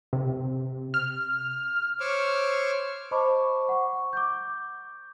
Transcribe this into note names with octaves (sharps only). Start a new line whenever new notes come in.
C3
F6
C5 C#5 C#6 D6 E6 F6
C5 D#5 A5 B5 C#6 D6
F#5 C#6
D6 G6